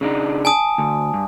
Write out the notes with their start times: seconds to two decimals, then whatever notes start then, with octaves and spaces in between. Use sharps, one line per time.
0.01 C#3 D4 D#4
0.45 G#5 A5 D#6
0.78 D2
1.14 G2